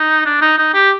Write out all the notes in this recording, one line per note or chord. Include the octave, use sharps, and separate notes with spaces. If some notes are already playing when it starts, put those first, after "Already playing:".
Already playing: D#4
D4
D#4
D#4
G4